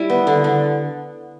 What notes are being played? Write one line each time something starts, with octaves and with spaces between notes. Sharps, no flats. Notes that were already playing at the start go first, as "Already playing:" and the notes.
Already playing: G3 E4
B3
D3
D3